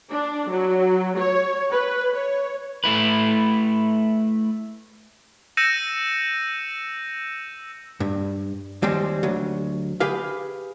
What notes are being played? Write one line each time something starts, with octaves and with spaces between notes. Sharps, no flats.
D4
F#3
C#5
B4
C#5
A3 E4 B4
E6 G6 A#6 C#7 D#7 E7
G2
D#2 G3 G#3 C4
D2 F#3
G4 G#4 B4 F5